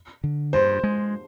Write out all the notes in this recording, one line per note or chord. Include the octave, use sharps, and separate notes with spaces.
D3
G2 C5
G#3